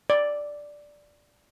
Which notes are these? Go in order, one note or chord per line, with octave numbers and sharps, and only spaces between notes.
D5